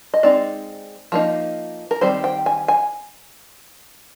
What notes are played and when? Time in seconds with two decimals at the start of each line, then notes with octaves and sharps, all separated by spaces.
0.14 D#5
0.23 G#3 C4 D#4 D5
1.12 F3 A#3 D#4
1.91 A#4
2.01 D#3 G3 C4 C5
2.24 G5
2.46 G#5
2.68 G#5